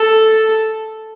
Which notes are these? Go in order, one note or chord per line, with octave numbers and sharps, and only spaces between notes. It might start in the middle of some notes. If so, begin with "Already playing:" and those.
Already playing: A4